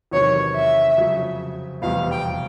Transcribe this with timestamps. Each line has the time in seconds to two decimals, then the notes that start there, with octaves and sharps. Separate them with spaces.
0.11 E2 C3 D#3 F#3 C#5
0.55 E5
0.97 F2 C#3 F#3
1.82 F1 E2 B2 G3 F5
2.11 G5